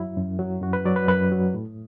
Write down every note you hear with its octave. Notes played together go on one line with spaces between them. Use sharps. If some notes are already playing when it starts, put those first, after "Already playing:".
Already playing: F#2 F#3 E4
F#2
F#3
F#2 F#4
B4
F#3 D5
B4
F#2 B4
F#3
A2